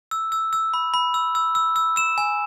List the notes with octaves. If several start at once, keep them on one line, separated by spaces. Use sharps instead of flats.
E6
E6
E6
B5
B5
E6
E6
E6
E6
E6 E7
G#5